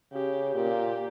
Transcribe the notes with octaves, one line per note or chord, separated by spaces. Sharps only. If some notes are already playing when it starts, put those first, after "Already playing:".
C#3 G4
A#2 G4